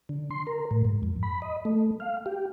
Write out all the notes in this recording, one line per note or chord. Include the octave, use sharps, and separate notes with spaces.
D3
C6
A#4
A2
G#2
F2
B5
D#5
A3
F5
G4